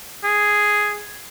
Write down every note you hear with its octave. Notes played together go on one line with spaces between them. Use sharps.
G#4